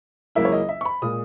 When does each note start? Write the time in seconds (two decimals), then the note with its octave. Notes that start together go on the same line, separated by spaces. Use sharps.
0.35 C#2 C#3 F#3 A#3 E4 E5
0.45 C#5
0.52 D#5
0.69 E5
0.81 C#6
0.85 B5
1.02 A#2 G#3 D#6